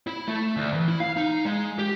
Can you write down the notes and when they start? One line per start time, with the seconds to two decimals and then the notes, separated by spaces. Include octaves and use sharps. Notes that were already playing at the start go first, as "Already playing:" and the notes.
0.07 E4
0.28 A3
0.57 D2
0.74 E3
0.88 E4
1.00 F5
1.17 D#4
1.45 G#3
1.79 G4